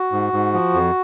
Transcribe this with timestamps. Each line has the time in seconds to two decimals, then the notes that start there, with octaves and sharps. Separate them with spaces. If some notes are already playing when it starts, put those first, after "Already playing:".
Already playing: F#4
0.12 G#2
0.33 G#2
0.54 F3
0.74 F2